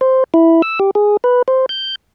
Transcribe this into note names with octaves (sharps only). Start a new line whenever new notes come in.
C5
E4
E6
G4
G#4
B4
C5
G6